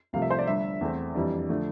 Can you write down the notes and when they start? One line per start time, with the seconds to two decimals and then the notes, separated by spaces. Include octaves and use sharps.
0.13 C2 C3 F3 A3 F5
0.22 E5
0.30 C5
0.38 D5
0.47 G1 G2 D3 E5
0.81 E2 E3 A3 C4
1.14 F2 E3 G3 D4
1.49 D3 F3 A3